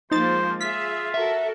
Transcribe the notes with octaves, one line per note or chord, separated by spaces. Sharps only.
F3 G#3 A#3 D#4 C5 A6
F4 G#4 E5 B6
F#4 A4 A#4 E5